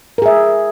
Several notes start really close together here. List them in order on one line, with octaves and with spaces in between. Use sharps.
A#4 G#4 E5